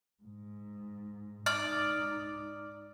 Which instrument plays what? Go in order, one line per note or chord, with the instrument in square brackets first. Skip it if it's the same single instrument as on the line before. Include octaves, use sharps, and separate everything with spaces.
[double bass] G#2
[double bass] G#2 D#4 [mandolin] D5 [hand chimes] F6